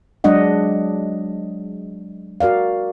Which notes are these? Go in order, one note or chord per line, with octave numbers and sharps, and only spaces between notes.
F#3 G#3 D4 D#5 F#5
F#4 A#4 D5 F5